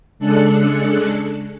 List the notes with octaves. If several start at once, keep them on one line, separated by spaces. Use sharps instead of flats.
C#3 G#3 D4 A4 F#6 C#7